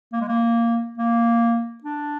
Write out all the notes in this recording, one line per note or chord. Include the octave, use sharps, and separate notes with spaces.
A#3
G#3
A#3
A#3
D4